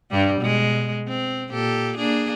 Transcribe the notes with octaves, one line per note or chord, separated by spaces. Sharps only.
G2 G3
B2 G#3
C4
A#2 G4 A4
A#3 D4 G#4